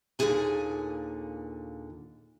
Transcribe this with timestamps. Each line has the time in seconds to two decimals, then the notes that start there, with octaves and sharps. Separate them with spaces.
0.19 D#2 A#2 D3 G#3 G#4 G#5